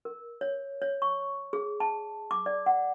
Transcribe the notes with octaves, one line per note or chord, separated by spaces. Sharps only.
A#4
C#5
C#5
C#6
G#4
A5
D6
D5
F#5